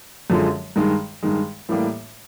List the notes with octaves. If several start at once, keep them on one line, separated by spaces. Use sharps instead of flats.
F#2 D3 F3 G#3
G2 D#3 G#3
G2 D#3 G#3
A2 E3 G3 A#3